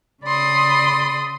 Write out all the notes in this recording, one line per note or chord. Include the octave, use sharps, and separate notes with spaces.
C#3 D5 B5 C6 D#6